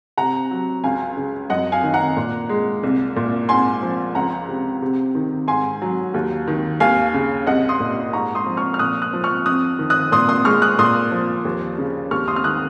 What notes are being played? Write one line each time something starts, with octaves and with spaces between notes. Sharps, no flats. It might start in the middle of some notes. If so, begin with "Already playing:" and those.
C3 F#5 A#5
F#3
C#2 F5 G#5
C#3
F#2 D#5 F#5
F5 G#5
D#3
F#5 A#5
A#2
G#3
C2
A#2
G#2 G#5 C6
F3
C#2 F#5 A#5
C3
C3
D#3
G#2 G#5 C6
F#3
D#2
D#3
D#2 F5 G#5
C#3
C2 D#5 F#5
C6 D#6
A#2
G#2 A#5 C#6
C6 D#6
F3
C#6 F6
F6
A#2 D#6 F#6
D#6 F#6
F3
C#6 F6
F2 D#6 F#6
D#3
D#6 F#6
A#2 C6 D#6
C6 D#6
G#3 C#6 F6
D#6 F#6
A#2 C6 D#6
F3
D#2
C#3
D#2 C#6 F6
C6 D#6
F6
D#3 D#6 F#6